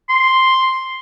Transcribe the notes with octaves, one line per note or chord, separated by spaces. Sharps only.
C6